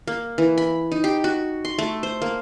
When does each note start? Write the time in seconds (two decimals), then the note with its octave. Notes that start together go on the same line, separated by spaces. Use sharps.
0.07 A#3
0.38 E3
0.58 B5
0.92 D#4
1.04 G4
1.24 F#4
1.65 C6
1.79 A3
2.03 C5
2.22 A#3